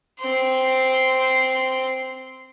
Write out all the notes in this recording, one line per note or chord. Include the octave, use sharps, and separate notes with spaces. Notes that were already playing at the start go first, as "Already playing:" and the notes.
C4 C6